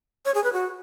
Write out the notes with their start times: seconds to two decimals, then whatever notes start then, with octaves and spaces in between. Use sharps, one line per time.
0.25 C#5
0.34 G#4
0.44 B4
0.53 F#4